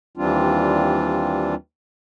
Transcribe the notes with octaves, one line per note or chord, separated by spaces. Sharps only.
D#2 E3 G3 C4 D4 F4